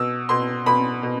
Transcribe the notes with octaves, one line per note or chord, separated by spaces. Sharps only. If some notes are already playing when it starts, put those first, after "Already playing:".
Already playing: B2 E6
B2 C6
B2 B5
B2